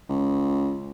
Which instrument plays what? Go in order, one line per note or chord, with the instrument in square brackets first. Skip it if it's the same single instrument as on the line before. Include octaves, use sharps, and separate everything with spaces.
[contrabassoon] C#2